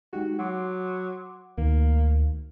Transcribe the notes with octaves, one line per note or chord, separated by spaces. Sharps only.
G#3 D#4 F#4 G4
F#3 F#5 C6 D6
D2 D#3 A#3